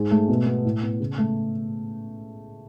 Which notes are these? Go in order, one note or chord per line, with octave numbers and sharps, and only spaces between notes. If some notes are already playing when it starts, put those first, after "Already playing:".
Already playing: G#2 G#3
A3
B2
B3
A2
B3
C#3
A3